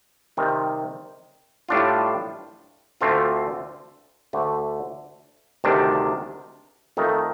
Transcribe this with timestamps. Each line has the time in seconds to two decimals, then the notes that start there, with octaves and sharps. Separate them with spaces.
0.37 C3 D#3 G3 C4
1.69 A2 G3 D4 F4
3.01 D2 D3 A3 C4 F4
4.33 D2 D3 A3
5.64 D2 C3 D#3 G3 D4
6.97 F2 D#3 A3 D#4